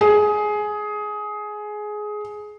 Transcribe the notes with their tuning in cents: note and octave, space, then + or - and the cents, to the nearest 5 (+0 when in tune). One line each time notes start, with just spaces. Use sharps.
G#4 +15